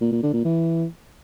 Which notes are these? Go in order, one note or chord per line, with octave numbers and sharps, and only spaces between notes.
A#2
A#2
D3
A#2
E3